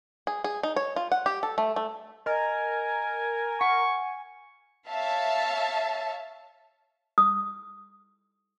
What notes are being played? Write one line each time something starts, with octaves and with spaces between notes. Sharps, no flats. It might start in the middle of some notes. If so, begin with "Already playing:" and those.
G#4
G#4
D#4
C#5
F4
F#5
G4
A4
A3
A3
A#4 D#5 G#5
F#5 C#6
C#5 E5 F5 A5
D#6